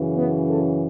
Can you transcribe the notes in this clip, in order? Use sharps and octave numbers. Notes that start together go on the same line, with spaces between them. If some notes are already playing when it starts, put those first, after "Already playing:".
Already playing: F#2 C#3 E3
B3
A4